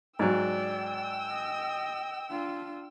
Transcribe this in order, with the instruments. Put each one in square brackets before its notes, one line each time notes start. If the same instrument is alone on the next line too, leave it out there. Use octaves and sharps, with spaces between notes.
[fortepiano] G#2 F#3 [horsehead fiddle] D5 [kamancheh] G5 E6
[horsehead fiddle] D#5
D4 F4